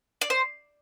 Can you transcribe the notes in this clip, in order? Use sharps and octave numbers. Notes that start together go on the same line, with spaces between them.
D5
C5